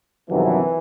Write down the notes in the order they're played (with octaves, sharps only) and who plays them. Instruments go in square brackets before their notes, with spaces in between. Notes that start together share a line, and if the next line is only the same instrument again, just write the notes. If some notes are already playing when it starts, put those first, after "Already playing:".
[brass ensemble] G1 F2 C3 D#3 F#3 [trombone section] E3